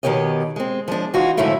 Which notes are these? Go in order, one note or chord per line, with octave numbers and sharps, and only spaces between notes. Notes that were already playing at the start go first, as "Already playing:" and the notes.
B2 D#3 B3 G4 C#5 D#5
G#3 C4
F3 G#3 D4
E3 D#4 F4 F#4
F2 G#2 D3 F#3 A3 E4